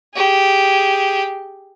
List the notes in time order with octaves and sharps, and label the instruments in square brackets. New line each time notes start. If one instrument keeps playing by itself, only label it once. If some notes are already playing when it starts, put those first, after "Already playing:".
[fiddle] G4 G#4